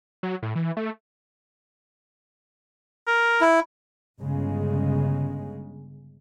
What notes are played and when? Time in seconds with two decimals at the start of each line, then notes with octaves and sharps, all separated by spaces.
0.23 F#3
0.43 A2
0.56 E3
0.77 A3
3.07 A#4
3.41 E4
4.19 G1 C#3 G#3